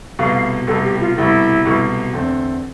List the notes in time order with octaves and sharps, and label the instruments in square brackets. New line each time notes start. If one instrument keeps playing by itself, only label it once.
[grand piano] C2 B2 A3 [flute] F5
[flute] F5
[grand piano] C2 B2 A3 [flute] A4
[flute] G4
F4
[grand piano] C2 B2 A3 [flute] E4
[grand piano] C2 B2 A3
E2 D3 A3 C4